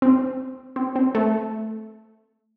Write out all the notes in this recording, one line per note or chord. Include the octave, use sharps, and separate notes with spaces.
C4
C4
C4
A3